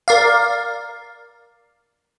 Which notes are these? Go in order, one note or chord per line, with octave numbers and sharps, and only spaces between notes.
A#4 D5 F5